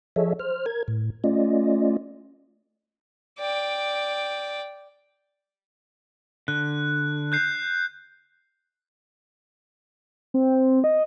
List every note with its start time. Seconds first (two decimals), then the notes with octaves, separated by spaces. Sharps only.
0.16 F3 G#4 A4 C#5 D#5 E5
0.39 C5 F6
0.66 A#4 G#6
0.88 A2
1.24 A3 C#4 F4 D5 D#5
3.39 D5 G5
6.48 D3 F#6
7.32 F#6 G6 C7
10.34 C4
10.84 D#5